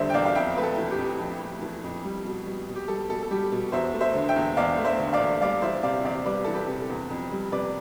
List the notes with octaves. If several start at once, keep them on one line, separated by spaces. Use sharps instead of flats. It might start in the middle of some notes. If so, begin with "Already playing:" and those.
Already playing: E2 D3 G3 C5 D5 E5
G5
E2 D5 F5
F5
F2 E5 G5
A3 B4
A4
E3
G4
F2
F2
A3
E3
F2
G3
B2
G3
B2
G4
G3 A4
B2 A4
A4
G3 G4
B2
E2 C5 E5
A3
C5 E5
D3
E5 G5
E2
E2 D5 F5
A3
C5 E5
D3
D5 F5
E2
G3 D5 F5
E3 C5 E5
C3 D5 F5
E2 D5 F5
G3 B4 D5
E3 A4
G4 B4
C3
A4
E2
F2
G3
C3 B4 D5